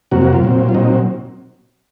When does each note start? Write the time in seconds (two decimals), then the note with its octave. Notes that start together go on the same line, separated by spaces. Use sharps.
0.11 F2 C3 F#3 A#3 F#4
0.22 F#4
0.33 F4
0.43 A#2 F#3 C4
0.69 F4
0.74 A#2 F#3 C4 D#4